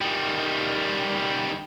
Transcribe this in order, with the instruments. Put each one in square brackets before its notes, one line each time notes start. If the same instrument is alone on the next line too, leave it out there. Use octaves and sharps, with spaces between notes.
[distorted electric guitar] D#3 G3